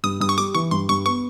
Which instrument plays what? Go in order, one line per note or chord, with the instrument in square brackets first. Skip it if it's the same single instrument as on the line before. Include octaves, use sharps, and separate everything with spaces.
[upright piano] G2 [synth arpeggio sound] D#6
[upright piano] G2 [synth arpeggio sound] D#6
[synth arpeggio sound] C#6
[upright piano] G3 [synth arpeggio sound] D6
[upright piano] E3 [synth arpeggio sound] C#6
[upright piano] G2 [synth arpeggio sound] C6
[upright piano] G2 [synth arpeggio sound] C#6
[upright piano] B3 [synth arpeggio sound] C#6